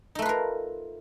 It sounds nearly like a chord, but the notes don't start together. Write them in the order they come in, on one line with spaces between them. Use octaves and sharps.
D#4 A3 B4 F4 A#4